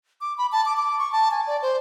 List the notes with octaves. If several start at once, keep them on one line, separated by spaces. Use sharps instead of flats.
D6
B5
A5
D6
D6
C#6
A5
G#5
D5
C5